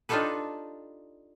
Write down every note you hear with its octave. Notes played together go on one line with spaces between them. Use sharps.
D4 D#4 F4 G4 A4 B4